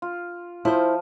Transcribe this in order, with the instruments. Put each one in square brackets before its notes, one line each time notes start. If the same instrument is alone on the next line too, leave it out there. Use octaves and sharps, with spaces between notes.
[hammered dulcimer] F4
[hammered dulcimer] F3 [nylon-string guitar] E4 C5